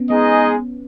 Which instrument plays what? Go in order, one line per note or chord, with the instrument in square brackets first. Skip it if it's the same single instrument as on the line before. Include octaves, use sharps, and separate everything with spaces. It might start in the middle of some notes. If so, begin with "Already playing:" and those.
Already playing: [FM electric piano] B3 C#4
[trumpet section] G#3 D#4 G#4 D#5 [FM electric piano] B3